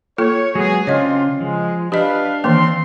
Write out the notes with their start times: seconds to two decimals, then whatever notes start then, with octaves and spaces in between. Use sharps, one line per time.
0.18 A#3 F4 A4 C#5
0.55 F#3 G#3 B3 F#4 G#4
0.87 C#3 C4 D4 F4 C#5 D#5
1.40 F3 G#3
1.92 D4 G4 B4 D#5 F5
2.44 D#3 E3 A#3 C4 C6